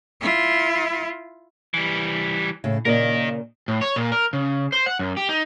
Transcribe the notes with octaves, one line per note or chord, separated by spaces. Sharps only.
E4 F4
E3 G3
A2 C#3
A#2 C#3 A#3 A#4 D#5
A2
C#5
A#2
A#4
C#3
C5
F#5
F#2
G4
D#4